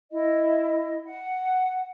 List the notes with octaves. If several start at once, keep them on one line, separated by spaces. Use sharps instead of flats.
E4 D#5
F#5